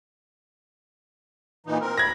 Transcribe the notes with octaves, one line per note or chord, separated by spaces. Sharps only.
A#2 E3 D#4
C4 A#4
D2 B5 G#6 A#6